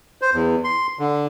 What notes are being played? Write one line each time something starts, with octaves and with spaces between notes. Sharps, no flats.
C5
E2
C6
D3